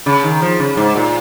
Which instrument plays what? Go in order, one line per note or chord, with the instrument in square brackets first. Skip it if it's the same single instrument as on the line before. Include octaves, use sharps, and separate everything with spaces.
[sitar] C#3
D#3
F3
C#3
G#2
A#2